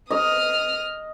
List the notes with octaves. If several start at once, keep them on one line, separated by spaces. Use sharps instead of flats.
D#5 D#6 F6